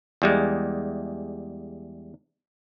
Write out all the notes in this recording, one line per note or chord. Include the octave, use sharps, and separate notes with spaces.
E2 G3 G#3